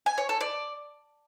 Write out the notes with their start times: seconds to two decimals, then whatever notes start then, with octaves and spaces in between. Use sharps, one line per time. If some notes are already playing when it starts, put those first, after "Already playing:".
0.06 G#5
0.18 C#5
0.29 A4
0.41 D5